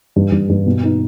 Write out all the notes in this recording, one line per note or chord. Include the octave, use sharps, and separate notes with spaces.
G2
G2
G2
B2
D#4